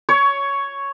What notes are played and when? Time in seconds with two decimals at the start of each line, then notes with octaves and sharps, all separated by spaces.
0.09 C#5